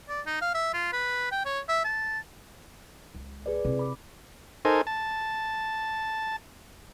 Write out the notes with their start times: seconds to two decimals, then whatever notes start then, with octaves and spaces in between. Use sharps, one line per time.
0.09 D5
0.26 D#4
0.41 F5
0.54 E5
0.73 F4
0.93 B4
1.32 G5
1.45 C#5
1.69 E5
1.84 A5
3.15 C#2
3.46 G#4 B4 D5
3.65 C3 E4
3.79 B5 D6
4.65 D#4 A4 A#4 C5 G#5
4.87 A5